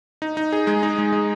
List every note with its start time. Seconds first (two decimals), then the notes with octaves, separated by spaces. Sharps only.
0.22 D#4
0.37 D#4
0.52 G#4
0.67 G#3
0.83 D#4
0.98 G#3
1.12 G#3